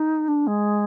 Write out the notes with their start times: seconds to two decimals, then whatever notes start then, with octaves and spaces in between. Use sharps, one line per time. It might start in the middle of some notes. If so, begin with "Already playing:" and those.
Already playing: D#4
0.28 D4
0.47 G#3